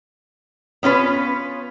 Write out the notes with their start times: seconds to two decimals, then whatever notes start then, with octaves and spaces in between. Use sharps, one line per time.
0.83 B3 C#4 F4 B4